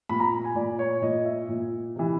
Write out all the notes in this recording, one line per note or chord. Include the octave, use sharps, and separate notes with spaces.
A#2 B5
A#5
G#5
A#2 D5
C#5
A#2 D#5
E5
A#2
C3 E3